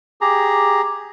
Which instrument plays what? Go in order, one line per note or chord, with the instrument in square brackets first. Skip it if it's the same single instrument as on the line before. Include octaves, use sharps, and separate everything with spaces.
[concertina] G4 G#4 A#5